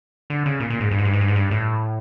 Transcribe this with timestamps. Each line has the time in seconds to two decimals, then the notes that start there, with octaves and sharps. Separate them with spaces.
0.30 D3
0.46 C#3
0.60 A#2
0.70 A#2
0.80 G#2
0.91 G2
0.99 G#2
1.05 G2
1.13 G#2
1.21 G2
1.28 G#2
1.35 G2
1.51 A2